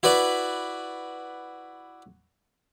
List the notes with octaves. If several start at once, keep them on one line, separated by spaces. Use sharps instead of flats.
E4 F#4 B4 D5